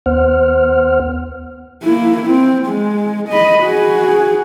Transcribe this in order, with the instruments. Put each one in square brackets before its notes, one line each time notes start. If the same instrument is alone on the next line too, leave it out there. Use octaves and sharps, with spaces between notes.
[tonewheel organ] D#2 B3 C5 F#5 F6
[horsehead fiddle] A#3 E4
C4
G#3
D#5 B5
F#4 G#4